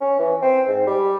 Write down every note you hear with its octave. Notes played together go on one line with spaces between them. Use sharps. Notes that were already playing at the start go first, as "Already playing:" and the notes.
C#4
E3
C4
G#2
G3